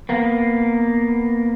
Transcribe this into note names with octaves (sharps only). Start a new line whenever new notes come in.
A#3 B3